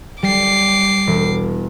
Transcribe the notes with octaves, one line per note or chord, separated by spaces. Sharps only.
G3 D6 C7
E1